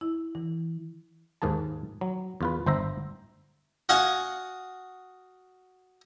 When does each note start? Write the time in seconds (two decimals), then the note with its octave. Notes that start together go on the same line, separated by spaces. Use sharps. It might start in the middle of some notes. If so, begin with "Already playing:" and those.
0.01 E4
0.35 E3
1.42 D#2 G#2 A#3 G#4 A5
2.01 F#3
2.41 E2 F4 B4
2.66 G1 C5 E5 A#5
3.89 F#4 D#5 F5 F#5 G#5